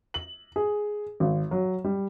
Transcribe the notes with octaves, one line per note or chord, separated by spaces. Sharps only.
F#7
G#4
G#1
F#3
G3